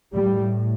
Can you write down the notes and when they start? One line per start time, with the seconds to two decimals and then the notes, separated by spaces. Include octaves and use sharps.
0.13 A2 G3